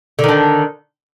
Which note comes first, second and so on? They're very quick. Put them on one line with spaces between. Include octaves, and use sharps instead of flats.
D3 D#3 D4